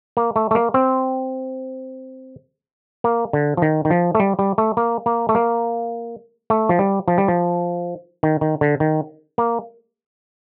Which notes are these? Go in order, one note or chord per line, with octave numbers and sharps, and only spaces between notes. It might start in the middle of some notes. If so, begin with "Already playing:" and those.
A#3
A3
A3
A#3
C4
A#3
D3
F3
D#3
D#3
F3
A3
G3
G3
A3
A#3
A#3
A3
A#3
A3
F3
G3
F3
G3
F3
D#3
D#3
D3
D#3
A#3